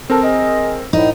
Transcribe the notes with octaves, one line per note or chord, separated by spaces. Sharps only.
C4 A4 A#4
G#4 D#5
C2 A2 D#4